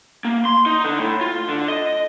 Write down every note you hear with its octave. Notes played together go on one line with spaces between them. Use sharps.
A#3
C6
D#4
D3
A2
F4
D3
D#5